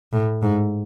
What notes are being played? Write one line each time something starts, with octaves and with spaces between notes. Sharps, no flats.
A2
G#2